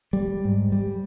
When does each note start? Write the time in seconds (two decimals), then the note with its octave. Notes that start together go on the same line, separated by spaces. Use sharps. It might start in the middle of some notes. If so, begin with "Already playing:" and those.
0.13 G3
0.45 G#2
0.72 G3